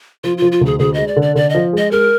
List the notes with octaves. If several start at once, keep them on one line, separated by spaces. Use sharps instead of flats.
F3 F4
F3 F4
F4
D2 G#4
D2 G#4
G#3 D#5
D5
D3
D5
D3 D5
F3 D#5
G#3 D#5
G#3 A#4